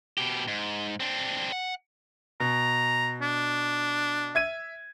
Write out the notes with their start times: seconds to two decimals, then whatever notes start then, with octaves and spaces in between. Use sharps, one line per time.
0.18 B2 G4
0.48 G#2
1.00 C4 D4
1.52 F#5
2.40 B2 A#5
3.21 D4
4.35 E5 G#6 D#7